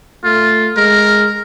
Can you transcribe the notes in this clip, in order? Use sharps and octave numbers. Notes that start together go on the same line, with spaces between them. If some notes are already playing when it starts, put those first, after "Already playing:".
A3 F4
G#3 A#4